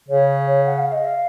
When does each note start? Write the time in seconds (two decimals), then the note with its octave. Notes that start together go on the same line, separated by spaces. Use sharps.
0.09 C#3 C#5
0.46 C#5
0.66 F#5
0.78 F5
0.92 D#5
1.04 F5